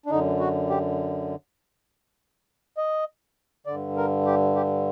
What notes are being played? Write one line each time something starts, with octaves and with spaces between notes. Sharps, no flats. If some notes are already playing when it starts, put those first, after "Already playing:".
D4
F#2 D3 D#4
F#4
G4
D#5
G2 D3 D5
A#4
G4
G4